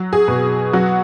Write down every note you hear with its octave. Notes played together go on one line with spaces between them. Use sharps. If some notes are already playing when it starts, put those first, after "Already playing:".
Already playing: F#3
G#4
B2
F#3 F#4